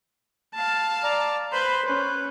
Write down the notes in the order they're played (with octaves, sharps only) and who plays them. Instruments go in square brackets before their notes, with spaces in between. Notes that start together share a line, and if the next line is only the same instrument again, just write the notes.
[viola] F5 A5
[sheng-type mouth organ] D5 A#5
[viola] B4 C5 [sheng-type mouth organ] B5 C6
[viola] C#4 [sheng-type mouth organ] B4